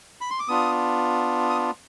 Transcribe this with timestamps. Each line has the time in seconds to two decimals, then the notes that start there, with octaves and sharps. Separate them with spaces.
0.21 B5
0.30 C6
0.39 D6
0.48 B3 D4 F4 D#6
1.50 D#6